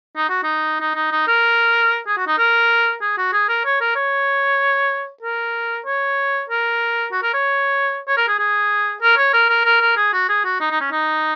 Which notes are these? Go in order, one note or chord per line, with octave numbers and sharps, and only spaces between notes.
D#4
F#4
D#4
D#4
D#4
D#4
A#4
G#4
F#4
D#4
A#4
G#4
F#4
G#4
A#4
C#5
A#4
C#5
A#4
C#5
A#4
F#4
A#4
C#5
C#5
A#4
G#4
G#4
A#4
C#5
A#4
A#4
A#4
A#4
G#4
F#4
G#4
F#4
D#4
D#4
C#4
D#4